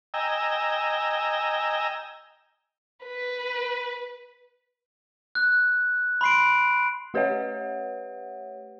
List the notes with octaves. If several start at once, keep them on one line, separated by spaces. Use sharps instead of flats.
D#5 G5 G#5 A#5 E6
B4
F#6
B5 C6 C7 D7
A3 G4 B4 C#5 E5 F#5